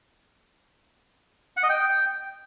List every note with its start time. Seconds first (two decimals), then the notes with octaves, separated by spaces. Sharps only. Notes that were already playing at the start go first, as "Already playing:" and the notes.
1.57 F#5
1.63 D#5
1.69 G5